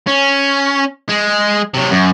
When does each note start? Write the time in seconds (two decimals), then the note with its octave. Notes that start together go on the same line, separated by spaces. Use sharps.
0.07 C#4
1.09 G#3
1.74 C3 F#3
1.91 F#2